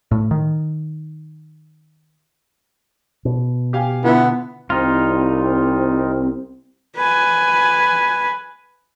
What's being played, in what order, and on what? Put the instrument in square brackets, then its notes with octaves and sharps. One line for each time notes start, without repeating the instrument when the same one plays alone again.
[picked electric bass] A2
D#3
[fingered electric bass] B2
[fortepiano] G4 F5 G#5
[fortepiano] D3 [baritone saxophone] B3 [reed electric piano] E4 F4 E5
[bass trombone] C2 [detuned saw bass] C4 [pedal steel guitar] D#4 F4
[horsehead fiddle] B4 G#5